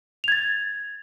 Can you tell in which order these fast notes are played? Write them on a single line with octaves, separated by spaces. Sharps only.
F7 G#6 A6